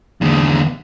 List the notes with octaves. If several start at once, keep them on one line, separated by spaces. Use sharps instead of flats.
E2 D3